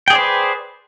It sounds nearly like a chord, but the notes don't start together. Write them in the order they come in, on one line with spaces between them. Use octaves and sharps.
G5 G#4 D5 C5 B4